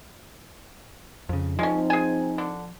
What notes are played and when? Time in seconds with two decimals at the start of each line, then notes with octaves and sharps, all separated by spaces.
1.29 F2 C#3
1.59 F3 G#3 C4 C#4 D#4
1.90 G#4 G#5
2.38 D3